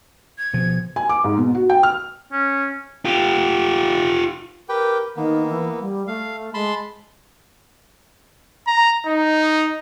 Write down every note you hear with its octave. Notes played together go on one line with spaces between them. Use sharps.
G#6
B2 F3
G#5
D6
G#2
B2
F#4
G5
F6
C#4
F4 G4
G4 A#4 B4 G5
D#3 A#3 B3
E3
G3
A3 F5
G#3 A5 B5 C6
A#5
D#4